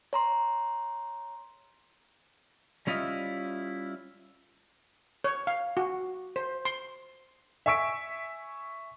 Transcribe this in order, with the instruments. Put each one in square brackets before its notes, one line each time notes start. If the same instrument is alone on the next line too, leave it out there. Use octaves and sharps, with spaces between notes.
[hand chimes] C#5 A#5 C6
[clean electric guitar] G3 C#4 E4 F4 D#5 E5
[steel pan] C#5
F5
F#4
C5
C6
[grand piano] E5 G#5 C#6 E6 B6 D7